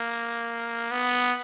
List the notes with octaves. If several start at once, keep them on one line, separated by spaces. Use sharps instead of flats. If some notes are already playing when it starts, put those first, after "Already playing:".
Already playing: A#3
B3